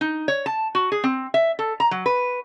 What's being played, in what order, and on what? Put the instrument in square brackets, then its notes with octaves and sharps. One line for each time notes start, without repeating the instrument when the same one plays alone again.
[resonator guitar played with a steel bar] D#4
C#5
A5
F#4
G#4
C4
E5
A4
A#5
F#3
B4